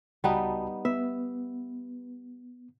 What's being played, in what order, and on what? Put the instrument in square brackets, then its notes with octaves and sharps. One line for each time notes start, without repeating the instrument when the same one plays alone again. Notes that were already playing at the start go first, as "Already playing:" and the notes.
[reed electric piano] C#2 F#4 A5 [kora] G3 B3 D#4
[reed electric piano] B3 [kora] E5